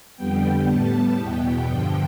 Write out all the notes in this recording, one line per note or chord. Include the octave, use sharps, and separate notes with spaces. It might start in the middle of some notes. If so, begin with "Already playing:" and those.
F2 D3 G3 B3 G5
A2 G3 B3 A5
E2 B2 B3 G5
G2 D3 F3